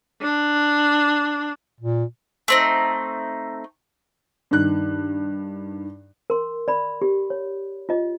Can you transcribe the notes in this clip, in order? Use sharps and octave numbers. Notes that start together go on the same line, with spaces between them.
D4
A#2
A3 C4 D#4
G2 D#3 F#6
A#4 C6
D5 B5
G4
C#5
F4 D#5